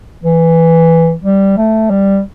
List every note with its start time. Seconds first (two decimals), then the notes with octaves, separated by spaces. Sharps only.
0.24 E3
1.23 G3
1.57 A3
1.90 G3